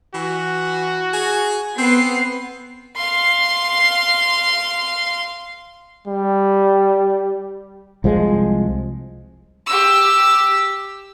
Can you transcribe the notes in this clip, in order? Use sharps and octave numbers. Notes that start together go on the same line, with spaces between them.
E3 F#4
G#4
B3 C4 C7
F5 C6
G3
C2 F3 G#3
G4 E6